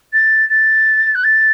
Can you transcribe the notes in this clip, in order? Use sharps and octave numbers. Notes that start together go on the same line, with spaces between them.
A6
A6
F#6
A6